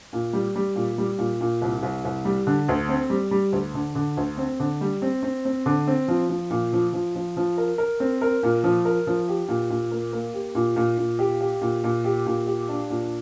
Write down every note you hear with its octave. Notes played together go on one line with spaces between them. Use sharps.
A#2
G3
G3
A#2
G3
A#2
A#2
C2
C2
C2
G3
D3
D2
C4
G3
G3
D2
D3
D3
D2
C4
D3
G3
C4
C4
C4
D3
C4
F3
F3
A#2
F3
F3
F3
F3
A#4
A#4
C4
A#4
A#2
F3
A#4
F3
G4
A#2
A#2
A#3
A#3
G4
A#2
A#2
A#2
G4
G4
A#2
A#2
G4
A#2
G4
D4
A#2